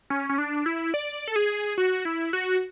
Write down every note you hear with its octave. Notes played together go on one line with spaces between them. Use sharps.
C#4
C#4
D4
E4
D5
A4
G#4
F#4
E4
F#4